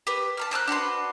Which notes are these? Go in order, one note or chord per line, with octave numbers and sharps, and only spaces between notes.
G4 B4
A5 A#5 F6
A#4 C5 E6 F#6
D4 F#4 B4 C6